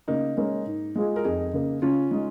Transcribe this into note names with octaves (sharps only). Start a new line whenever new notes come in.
C#3 A#3 D#4
G#3 C#4 A#4
G#2
G#3 F4 G#4
A#4
F2 D#4 G#4
C#3 A#3
C#3 C#4 F4
G#3 D#4 G#4